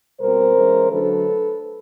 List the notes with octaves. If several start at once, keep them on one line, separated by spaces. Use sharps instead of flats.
B2 G3 C4 A#4 C5
E3 G#3 C#4
D3 F#3 A3 D4 A4 B4